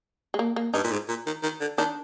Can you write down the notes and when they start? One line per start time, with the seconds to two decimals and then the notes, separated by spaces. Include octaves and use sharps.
0.34 G#3
0.39 A#3
0.56 A#3
0.74 G2 D#4
0.84 A#2
0.92 G#2
1.09 A#2
1.26 D#3
1.43 D#3
1.61 D3
1.78 D#3 D4